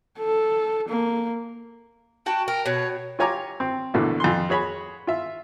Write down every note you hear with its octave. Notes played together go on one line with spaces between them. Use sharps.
A4
A#3
F#4 G5 A5
A#4 G5
B2 C#5
F4 G4 C#5 G#5 A#5 D6
C4
A#1 B2 D3 E3 A3
F2 C6
F#4 G#4 C#5 B5
F4 E5